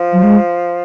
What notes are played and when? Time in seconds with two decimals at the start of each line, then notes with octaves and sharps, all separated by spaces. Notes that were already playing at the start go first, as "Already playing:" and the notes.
Already playing: F3
0.13 F#3
0.23 G#3